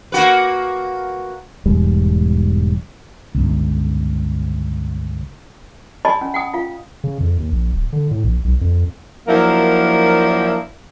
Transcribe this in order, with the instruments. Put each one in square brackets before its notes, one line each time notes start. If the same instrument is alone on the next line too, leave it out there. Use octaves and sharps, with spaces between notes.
[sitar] A#3 F#4 B4
[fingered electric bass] E1 E2 G#2 G3
[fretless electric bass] G1 C#2
[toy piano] D5 D#5 G#5 A5 B5 C6
C#4
F#5 G5 D#6
F4 F5
[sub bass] C#3
F2
D#2
A#1
D1
D3
A2
A#1
B1
F2
[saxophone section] F3 F#3 A#3 D4 E4 A#4